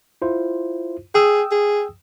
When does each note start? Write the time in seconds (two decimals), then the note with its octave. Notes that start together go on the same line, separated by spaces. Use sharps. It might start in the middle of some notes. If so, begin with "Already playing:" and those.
0.22 E4 F4 C5
1.14 G#4 G5 D#6 E6
1.51 G#4